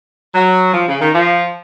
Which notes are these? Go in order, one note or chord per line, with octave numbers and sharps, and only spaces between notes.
F#3
F3
C#3
D#3
F3